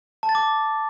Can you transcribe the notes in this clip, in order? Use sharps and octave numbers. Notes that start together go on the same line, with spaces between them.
A5
A6
D6